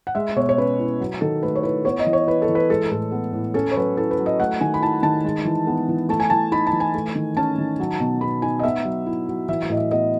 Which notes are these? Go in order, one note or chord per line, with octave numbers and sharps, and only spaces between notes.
F#5
G#3 E5
B2 C#5
C#5
C#4 B4
E4
F#3
D#3 A4
A3 B4
C#5
E4 B4
B3 C#5
D#5
E3
C#5
E4 B4
A4
E3
B4
G#3 A4
A2 A4
B3
A2
C#4 A4
C#5
F#3 B4
E4 A4
B4
F#3
D#5
A3 F#5
D#3 G#5
B5
E4 A5
D#3 A5
G#3
E3
B3
E3
A3 A5
G#5
E3 A5
D#4 B5
A5
E3
G#5
A3
D#3
C#4 A5
D#3
F#3
B2
B3 B5
D#4 G#5
D#5
B3 E5
F#3
E4
F#3
E3 E5
E5
A2 D#5
E5
B3 D#5